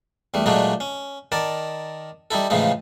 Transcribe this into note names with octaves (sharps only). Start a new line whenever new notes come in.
E2 G3 A3
A#2 F#3 G#3 A3 D4 D#4
C#4
D#3 A#4 D5 A5
G3 D#4 E4 A4
A2 C#3 E3 F3 G#3 D#4